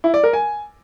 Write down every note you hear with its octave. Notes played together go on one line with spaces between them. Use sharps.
E4
D5
A#4
G#5